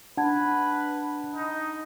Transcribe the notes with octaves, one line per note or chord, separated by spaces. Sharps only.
D4 B4 F#5 A5 G#6
D#4